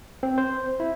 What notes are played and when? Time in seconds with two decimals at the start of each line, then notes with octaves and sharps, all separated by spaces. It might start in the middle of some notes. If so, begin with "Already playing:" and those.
0.23 C4
0.38 C5
0.80 E4